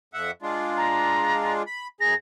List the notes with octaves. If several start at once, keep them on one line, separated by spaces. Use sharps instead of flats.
F2 E5 F#5
G#3 D4 F4
A#5
B5
F#2 G#4 A#5 A#6